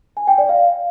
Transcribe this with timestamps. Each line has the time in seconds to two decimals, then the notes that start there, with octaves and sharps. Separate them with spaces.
0.17 G#5
0.27 G5
0.38 D5
0.49 F5